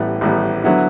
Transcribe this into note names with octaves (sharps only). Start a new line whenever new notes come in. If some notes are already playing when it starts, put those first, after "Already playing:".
Already playing: A1 A2 G3 B3
A1 A2 G3 B3
D3 F#3 B3 E4